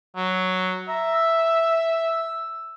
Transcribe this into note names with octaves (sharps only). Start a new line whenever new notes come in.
F#3
E5 A#5
E6